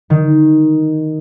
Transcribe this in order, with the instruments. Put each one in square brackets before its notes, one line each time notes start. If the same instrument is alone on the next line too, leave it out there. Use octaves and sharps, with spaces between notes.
[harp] D#3